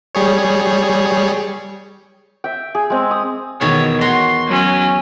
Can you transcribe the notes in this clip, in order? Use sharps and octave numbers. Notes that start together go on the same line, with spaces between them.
G3 G#4 C#5
E5 G5
G#4
G#3 C4
D#6
E2 B2 D#3 C#5
F#4 C#5 A#5 C6
F#3 C#4